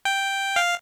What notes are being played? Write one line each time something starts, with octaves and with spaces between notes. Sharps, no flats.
G5
F5